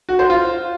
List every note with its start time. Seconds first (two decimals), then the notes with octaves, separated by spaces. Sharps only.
0.09 F#4
0.19 C5
0.30 F4